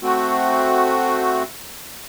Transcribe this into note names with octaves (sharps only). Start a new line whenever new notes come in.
A3 C4 F#4